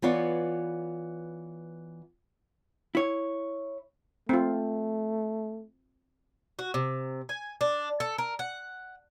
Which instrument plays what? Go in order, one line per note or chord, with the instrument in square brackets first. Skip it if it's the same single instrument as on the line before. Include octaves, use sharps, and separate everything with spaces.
[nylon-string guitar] E3 B3 F4 C#5 D5
[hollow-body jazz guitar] E4 C#5
[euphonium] A3 [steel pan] C4 F4
[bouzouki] F#4
C3
G#5
D4
A4
A#4
F#5